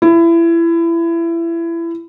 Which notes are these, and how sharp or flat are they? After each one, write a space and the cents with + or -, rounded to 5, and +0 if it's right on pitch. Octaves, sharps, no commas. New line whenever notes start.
E4 +25